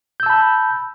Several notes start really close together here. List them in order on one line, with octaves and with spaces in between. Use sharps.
G6 E6 A5 B5